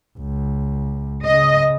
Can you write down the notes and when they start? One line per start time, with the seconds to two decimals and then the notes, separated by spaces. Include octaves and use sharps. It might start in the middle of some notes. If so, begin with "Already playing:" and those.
0.18 C#2
1.26 C#3 D#5